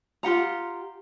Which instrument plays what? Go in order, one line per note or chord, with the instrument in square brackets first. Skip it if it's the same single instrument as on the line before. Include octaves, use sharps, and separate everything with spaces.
[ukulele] F4 G4 F#5 A#5